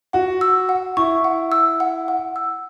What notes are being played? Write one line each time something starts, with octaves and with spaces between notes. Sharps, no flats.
F#4 F#5
E6
F#5
E4 C#6
F#5
E6
F#5
F#5
E6